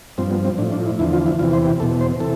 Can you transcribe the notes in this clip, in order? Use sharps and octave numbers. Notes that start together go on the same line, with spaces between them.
G2 F3 C4
B3
C4
A2 F3 D4
D4
E4
E2 D3 F3 E4
F4
E4
E2 C3 E3 F4
C5
G4
E2 B2 A4
C5
C3 E3 A4